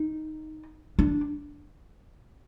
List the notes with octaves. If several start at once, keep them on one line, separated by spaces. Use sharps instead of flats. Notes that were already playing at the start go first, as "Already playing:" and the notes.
Already playing: D#4
D4